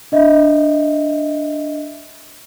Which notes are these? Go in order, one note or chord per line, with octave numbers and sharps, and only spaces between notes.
D4 D#5 E5